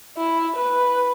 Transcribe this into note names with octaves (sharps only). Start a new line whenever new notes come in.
E4
B4